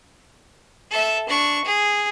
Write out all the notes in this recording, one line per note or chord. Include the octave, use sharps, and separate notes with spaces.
A4 E5
D4 C#6
G#4